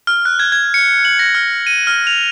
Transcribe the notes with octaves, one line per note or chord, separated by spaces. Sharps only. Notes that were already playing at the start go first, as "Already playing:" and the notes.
F6
F#6
G#6
G#6
C#7
F#7
A#6
F6
D#7
F6
F7